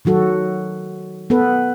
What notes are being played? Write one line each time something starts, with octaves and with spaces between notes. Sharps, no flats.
D#3 F#3 F#4 A4
B3 A4 B4